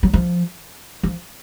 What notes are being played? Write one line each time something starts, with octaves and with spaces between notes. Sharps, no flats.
F#3
F3
F3